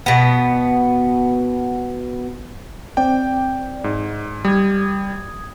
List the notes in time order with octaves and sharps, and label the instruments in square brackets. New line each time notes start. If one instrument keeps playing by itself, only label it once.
[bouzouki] B2 B3
[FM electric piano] C4 D5 [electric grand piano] G5
[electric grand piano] G#2
[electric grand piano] G3 [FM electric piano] D#6 G#6